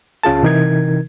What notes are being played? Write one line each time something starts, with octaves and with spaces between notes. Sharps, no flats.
C#2 C#4 F4 G#4 A5
C3 E3 D#4 A#4 G#6